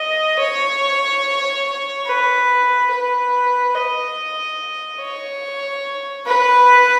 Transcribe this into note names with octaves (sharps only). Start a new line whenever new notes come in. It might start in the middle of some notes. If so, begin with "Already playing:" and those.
Already playing: D#5
C#5
B4
B4
D#5
C#5
B4